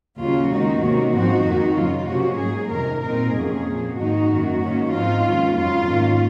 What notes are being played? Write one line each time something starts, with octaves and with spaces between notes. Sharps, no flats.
D#2 C#3 F#3 C#4 F4
D#2 D#3 G#3 D#4 F#4
C3 D#3 A#3 C#4
G#2 F3 C4 D#4 F#4
F2 D#3 A#3 D#4
F#2 C#3 F#3 F4
C3 F3 A#3 C#4 F#4
G#2 F#3 A#3 G#4
F2 C3 D#3 A#4
A#2 F#3 C4 D#4 A#4
F2 C3 F#3 A#3 C#4 G#4
A#2 F3 A#3
G#2 D#3 A#3 D#4 F#4
F#2 D#3 A#3
G#2 D#3 A#3 C#4
G#2 F3 C4 D#4 F4
D#2 D#3 G#3 C#4
F2 C#3 F#3 F4
G#2 D#3 A#3 C#4